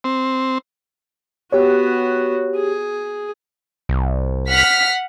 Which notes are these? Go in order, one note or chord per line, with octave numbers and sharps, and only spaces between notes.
C4
B3 F#4 G4 C#5
G#4
C2
F#5 F6 B6